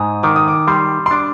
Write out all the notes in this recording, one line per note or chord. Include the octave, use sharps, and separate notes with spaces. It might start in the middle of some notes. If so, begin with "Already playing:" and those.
Already playing: G#2 D#6
D#3 D6
D#6
D6
G3 C6
C6
D4 D6